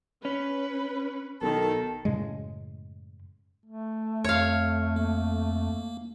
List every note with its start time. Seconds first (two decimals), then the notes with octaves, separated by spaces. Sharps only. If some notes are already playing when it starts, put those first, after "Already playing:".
0.25 C#4 B4
1.42 B1 D#3 A4
2.05 F#2 A2 C#3 G#3
3.66 A3
4.24 F2 C#5 F5
4.96 A#3